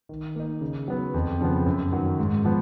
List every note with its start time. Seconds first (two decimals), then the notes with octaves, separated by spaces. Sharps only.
0.09 D#3
0.36 A#3 D#4
0.61 C#3
0.88 F#3 B3
1.14 F2
1.41 C#3 F3 B3
1.66 F#2
1.92 D#3 F#3
2.19 G#2
2.45 F3 B3